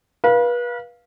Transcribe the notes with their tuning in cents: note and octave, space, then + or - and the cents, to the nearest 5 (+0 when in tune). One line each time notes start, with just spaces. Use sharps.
B4 -35 F5 +0